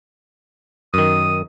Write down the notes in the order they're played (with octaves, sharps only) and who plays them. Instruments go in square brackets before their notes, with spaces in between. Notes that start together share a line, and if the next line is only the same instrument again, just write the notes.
[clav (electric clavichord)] F#2 D#3 [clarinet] D#6